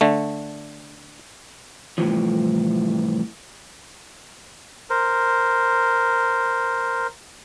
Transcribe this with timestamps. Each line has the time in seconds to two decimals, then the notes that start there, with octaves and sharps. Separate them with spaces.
0.01 D3 A3
1.98 C2 A2 E3 F3
4.90 A#4 C5